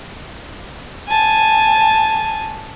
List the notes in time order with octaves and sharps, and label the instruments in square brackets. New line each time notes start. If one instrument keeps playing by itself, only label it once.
[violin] G#5 A5